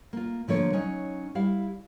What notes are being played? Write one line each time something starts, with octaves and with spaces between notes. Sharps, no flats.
A#3 F4
D3 F3 A#3 C#5
F#3 C#4 D#4
G3 E4 F5